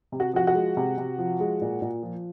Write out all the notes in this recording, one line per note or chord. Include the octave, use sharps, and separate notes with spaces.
C3
F#4
F3 F#4
F#4
G#3
C3
C3
F3
G#3
A#2
A#2
F3